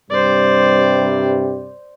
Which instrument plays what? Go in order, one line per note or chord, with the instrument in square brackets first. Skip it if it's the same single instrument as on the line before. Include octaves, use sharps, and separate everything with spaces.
[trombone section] G2 C3 G3 [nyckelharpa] C5 D5